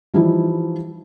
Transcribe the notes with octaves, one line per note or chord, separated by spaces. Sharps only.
E3 F3 G3 D#4 E4